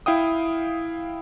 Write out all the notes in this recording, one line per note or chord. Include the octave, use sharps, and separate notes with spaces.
E4 F5 G5 D#6